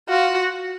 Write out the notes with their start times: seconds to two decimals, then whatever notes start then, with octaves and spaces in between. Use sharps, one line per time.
0.09 F4 F#4